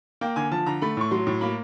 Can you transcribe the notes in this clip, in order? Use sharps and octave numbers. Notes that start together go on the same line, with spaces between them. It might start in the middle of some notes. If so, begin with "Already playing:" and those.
A#3 G5
D3 G#5
F3 A5
D3 A#5
A3 B5
A2 C#6
F#3 C6
A2
A#3 B5